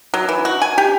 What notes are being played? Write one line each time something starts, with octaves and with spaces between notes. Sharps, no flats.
F#3
E3
F#4
G#5
G4